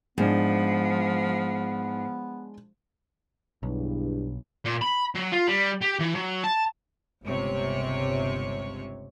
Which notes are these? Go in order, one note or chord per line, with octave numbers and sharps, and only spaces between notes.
G#2 F3 G#3 B3 D4
B1 E2 G2
A#2
B5
F#3
F4
G3
G4
E3
F#3
A5
G1 C#2 C3 C#5